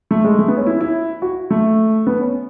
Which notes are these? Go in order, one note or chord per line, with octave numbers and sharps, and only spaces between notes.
A3
G#3
A3
B3
C#4
E4
E4
F#4
A3
B3
C#4